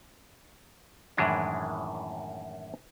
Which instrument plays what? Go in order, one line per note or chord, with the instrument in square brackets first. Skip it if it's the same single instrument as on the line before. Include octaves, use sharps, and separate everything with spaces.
[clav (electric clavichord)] F#2 A2 D#3 E3 G#3 D4